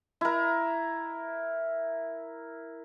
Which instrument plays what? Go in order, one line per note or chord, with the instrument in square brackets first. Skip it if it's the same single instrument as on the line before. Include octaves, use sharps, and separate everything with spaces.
[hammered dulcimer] E4 A#4